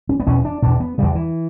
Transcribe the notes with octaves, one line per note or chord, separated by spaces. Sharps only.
C#4
B3
E2 B2 C#4
D4
E2 B2 D4
B3
E2 C#3 G3
E3